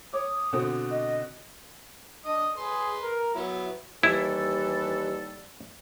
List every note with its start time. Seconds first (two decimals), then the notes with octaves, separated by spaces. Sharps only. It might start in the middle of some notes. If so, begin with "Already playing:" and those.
0.13 C#5 D6 D#6
0.53 B2 D3 C4
0.90 D#5
2.26 D4 D#5 D#6
2.57 G#4 B4 C6
3.02 A#4
3.35 F#3 B3 E4
4.03 D#2 E3 G3 E4 A4